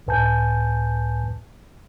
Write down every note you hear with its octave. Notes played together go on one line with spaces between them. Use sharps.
C#2 A2 B4 G#5 A5 G6